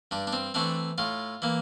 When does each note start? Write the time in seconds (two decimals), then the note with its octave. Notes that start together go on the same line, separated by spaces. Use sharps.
0.11 G2 D4
0.27 D4
0.33 C4
0.54 E3 A3 C4 D4
0.98 A2 F4
1.42 E3 A#3